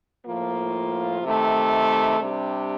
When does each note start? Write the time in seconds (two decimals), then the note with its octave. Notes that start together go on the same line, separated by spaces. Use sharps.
0.24 A2 F3 A#3 F4
1.22 C3 D#3 A3
2.19 C3 G3 D4 G4